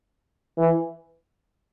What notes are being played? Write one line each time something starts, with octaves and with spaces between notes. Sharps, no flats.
E3